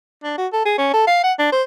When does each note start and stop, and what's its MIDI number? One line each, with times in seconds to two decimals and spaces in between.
0.24 0.38 62
0.38 0.47 66
0.53 0.64 69
0.65 0.75 68
0.78 0.91 61
0.94 1.06 69
1.07 1.19 77
1.24 1.33 78
1.39 1.51 62
1.52 1.63 72